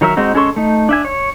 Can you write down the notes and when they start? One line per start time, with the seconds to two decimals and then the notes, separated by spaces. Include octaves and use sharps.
0.01 D#3 F#3 A#4 E5
0.17 G#3 C4 D#4 F#4
0.34 G#3 C#4 A4 C6 C#6
0.56 A3 D#4
0.89 D4 E5 G#5
1.05 C#5